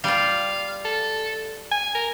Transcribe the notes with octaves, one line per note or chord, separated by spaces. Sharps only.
G3 F4 F5
A4
G#5
A#4